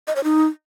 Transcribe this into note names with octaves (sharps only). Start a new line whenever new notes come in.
D#5
C#5
D#4